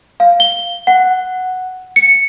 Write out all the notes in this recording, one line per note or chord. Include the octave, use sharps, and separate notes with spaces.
F5
G7
F#5
C#7